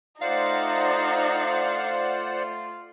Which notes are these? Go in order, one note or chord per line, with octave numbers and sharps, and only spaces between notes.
A3 D#4 F4 C5 D5 F5 F#5